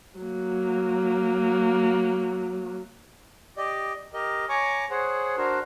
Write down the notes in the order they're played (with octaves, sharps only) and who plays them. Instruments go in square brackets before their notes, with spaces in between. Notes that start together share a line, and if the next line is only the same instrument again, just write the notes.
[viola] F#3 A#3
[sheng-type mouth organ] G4 D5 D#5
G4 A#4 D#5
C#5 G#5 A#5 C#6 D6
G#4 C5 C#5 F#5
D4 F#4 A#4 C5